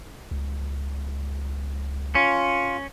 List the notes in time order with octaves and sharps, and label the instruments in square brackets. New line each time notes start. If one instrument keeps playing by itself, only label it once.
[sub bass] C#2
[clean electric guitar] C#4 [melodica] F4